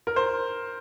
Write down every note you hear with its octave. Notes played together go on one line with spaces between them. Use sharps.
A#4
C5